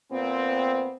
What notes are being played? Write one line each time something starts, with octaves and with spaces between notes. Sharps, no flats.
A#2 B3 C4